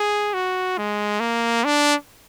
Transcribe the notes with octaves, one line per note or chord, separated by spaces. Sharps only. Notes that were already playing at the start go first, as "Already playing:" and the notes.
Already playing: G#4
F#4
G#3
A#3
D4